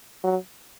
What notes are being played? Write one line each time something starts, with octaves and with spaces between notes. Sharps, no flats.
F#3